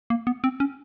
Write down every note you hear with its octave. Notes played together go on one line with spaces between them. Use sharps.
A#3
B3
C4
C#4